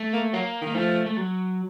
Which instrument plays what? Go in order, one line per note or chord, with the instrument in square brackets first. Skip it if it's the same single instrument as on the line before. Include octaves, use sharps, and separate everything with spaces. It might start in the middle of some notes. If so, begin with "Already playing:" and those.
Already playing: [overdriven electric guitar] A3
[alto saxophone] A#3
[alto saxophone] F#3 [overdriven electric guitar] A#3
[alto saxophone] D#3
[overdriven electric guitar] A#3
[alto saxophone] F3 [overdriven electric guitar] A3
[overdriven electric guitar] A3
F#3